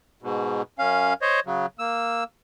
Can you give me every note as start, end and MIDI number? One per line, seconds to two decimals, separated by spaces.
0.22 0.62 44
0.22 0.62 47
0.79 1.14 42
0.79 1.14 61
0.79 1.14 77
1.22 1.40 72
1.22 1.40 73
1.22 1.40 75
1.46 1.66 49
1.46 1.66 54
1.79 2.24 58
1.79 2.24 88